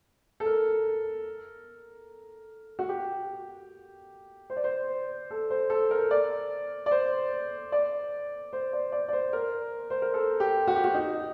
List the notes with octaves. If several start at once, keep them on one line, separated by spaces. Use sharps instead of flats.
A4
A#4
F#4
G4
C5
D5
C5
A4
C5
A4
A#4
D5
D5
C5
D5
C5
D5
D5
D5
C5
A#4
C5
A#4
A4
G4
F#4
G4
F#4
D#4